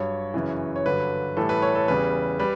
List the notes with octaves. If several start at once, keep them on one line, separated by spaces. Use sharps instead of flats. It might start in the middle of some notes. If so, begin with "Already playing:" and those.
Already playing: G2 F#3 C#5
F#2 C#3 E3
C#5
G2 D3 F#3 B4
A2 E3 G3 A4
B4
C#5
A4
E2 C#3 G3 B4
G3 B4